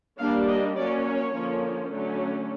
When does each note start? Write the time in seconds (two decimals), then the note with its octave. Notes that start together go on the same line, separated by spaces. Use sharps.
0.18 G3 A#3 D4 F5
0.47 D#5
0.76 F#3 A#3 C#4 D5
1.04 C#5
1.33 D3 F3 A#3 C#4
1.91 D3 F#3 A3 C#4